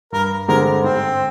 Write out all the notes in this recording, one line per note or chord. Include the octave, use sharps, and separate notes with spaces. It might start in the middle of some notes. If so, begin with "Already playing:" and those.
G2 A#4
D3 G#3 C4 G4 A#4
G#2 C4